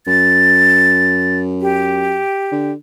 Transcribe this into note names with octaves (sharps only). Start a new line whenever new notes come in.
F#2 A6
G4
D3